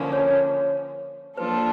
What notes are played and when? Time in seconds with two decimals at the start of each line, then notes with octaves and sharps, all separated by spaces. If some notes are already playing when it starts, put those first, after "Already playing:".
Already playing: D3 F3 A#3 C#4
0.13 C#5
1.37 F3 A#3 D4 F4 A4 B4